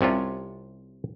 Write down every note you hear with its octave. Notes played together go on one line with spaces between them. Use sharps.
C2 C3 C#4 F4